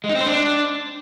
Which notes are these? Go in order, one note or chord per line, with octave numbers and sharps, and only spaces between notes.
G#3
D#4
C4
C5
D4